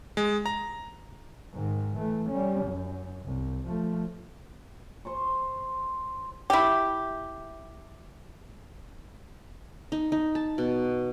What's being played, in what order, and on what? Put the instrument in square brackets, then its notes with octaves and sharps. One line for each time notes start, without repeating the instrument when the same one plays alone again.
[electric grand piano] G#3
A#5
[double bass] G#2 D#3
E3 A3
G3 C#4
F#2
C2
F3 A3
[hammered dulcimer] C5 C6 C#6
[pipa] E4 G4
[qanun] D#4
D#4
A5
B2